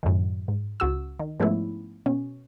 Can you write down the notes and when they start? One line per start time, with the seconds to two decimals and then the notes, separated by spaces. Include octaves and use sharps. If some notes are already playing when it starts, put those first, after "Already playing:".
0.03 F#2 A2 D#3
0.48 G#2
0.80 C#2 F#4 E6
1.20 D#3
1.40 G#2 F3 A3 B3 C#4 E4
2.06 B2 C#4